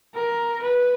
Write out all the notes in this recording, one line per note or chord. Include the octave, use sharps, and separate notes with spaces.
A#4
B4